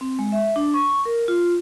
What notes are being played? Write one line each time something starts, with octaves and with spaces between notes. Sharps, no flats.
C4
G#3
E5
D4
C#6
A#4
F4